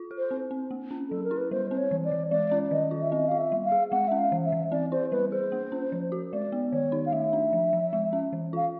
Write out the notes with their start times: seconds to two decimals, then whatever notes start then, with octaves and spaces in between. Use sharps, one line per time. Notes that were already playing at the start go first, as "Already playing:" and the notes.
Already playing: F4
0.11 A4
0.18 C5
0.31 C4
0.51 C4
0.71 A#3
0.91 C#4
1.10 F#3 A4
1.24 A#4
1.31 E4
1.37 B4
1.51 G3 C5
1.71 C4 C5
1.78 C#5
1.91 E3
2.05 D5
2.11 E3
2.31 G#3 D5
2.51 C#4
2.63 D5
2.71 D#3 D#5
2.91 F4
3.02 E5
3.12 C4 D#5
3.28 F4 F5
3.38 E5
3.52 G3
3.65 F5
3.72 G#4
3.92 G#3 F#5
4.08 C#4 E5
4.18 F5
4.32 E3
4.45 E5
4.52 E3
4.71 C4 D5
4.92 E4 C5
5.11 G3 B4
5.32 G#4 C5
5.52 A#3
5.72 C#4
5.92 F3
6.12 F#4
6.33 G#3 D5
6.52 B3
6.72 D#3 C#5
6.92 D#4
7.06 F5
7.12 A3 E5
7.33 D4
7.53 F3
7.73 F3
7.93 G#3
8.13 C#4
8.33 E3
8.53 F4 F5